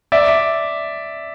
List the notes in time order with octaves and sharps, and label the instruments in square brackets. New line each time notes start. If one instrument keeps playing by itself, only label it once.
[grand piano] D5 E5